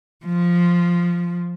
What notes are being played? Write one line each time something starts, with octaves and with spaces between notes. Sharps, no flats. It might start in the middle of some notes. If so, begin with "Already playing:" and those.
F3